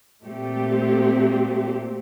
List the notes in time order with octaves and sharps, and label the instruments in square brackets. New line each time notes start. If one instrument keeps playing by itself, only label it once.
[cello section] A#2 A3 C4 G4